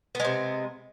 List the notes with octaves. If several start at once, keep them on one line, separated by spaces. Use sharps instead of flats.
C3 G#3 B3